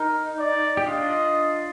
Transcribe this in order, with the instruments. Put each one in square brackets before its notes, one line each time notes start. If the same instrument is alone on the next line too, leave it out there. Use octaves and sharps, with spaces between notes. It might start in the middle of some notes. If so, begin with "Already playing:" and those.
Already playing: [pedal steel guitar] D#4 [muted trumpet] A#4
[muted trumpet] D5
[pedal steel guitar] G4
[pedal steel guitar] D4 F4 [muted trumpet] D#5